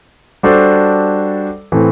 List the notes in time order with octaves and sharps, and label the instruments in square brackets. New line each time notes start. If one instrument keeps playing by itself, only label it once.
[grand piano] G3 D4 F#4 A4 C5
A2 E3 A3 C4